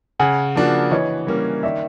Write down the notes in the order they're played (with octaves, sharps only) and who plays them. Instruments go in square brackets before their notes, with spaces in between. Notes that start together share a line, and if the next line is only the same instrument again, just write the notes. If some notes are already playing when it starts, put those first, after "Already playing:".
[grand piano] C#3 [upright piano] F#5 G#5
[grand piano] F3 A#3 D4 F#4
[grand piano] E3 [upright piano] C#5 D#5
[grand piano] G3 A#3 C#4
[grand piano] D#3 [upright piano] D5 E5